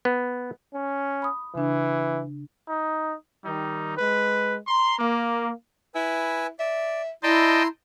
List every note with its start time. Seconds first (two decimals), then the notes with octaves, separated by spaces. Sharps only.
0.05 B3
0.74 C#4
1.22 B5 D#6
1.55 C#3 E3 D4
2.69 D#4
3.44 D#3 G3 D#4
3.97 G#3 B4
4.67 A#5 C6
4.99 A#3
5.95 E4 B4 G#5 E6
6.59 D5 E5
7.23 E4 D5 D#5 G5 A5 A#5 C6